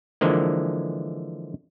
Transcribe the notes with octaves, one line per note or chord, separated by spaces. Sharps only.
D3 E3 F3 G#3 A#3